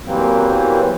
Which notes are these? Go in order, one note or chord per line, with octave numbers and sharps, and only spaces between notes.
E2 E3 F#3 G3 A#3 C4